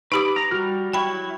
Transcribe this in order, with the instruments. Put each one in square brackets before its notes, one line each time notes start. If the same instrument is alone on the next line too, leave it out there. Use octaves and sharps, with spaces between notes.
[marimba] D#4 G4 D#6 [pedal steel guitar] B4 B5 D6
[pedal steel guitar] A#5 [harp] A#6
[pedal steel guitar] G3 F6 [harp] F#4
[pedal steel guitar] F#3 E4 C#6 [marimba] G5 B5